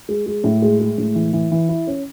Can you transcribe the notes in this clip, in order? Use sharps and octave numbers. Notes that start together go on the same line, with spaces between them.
G#3
G#3
A2
G#3
G#3
A2
E3
E3
E3
E4
C#4